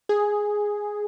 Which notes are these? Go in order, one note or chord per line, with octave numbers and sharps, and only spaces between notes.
G#4